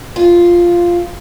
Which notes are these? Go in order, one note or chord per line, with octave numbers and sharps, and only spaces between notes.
F4